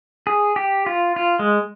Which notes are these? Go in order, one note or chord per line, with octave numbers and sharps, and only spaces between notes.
G#4
G4
F4
F4
G#3